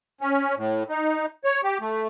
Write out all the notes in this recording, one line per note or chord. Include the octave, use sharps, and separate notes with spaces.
C#4
A2
D#4
C#5
G4
A3